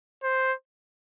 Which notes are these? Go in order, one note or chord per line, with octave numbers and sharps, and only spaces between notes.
C5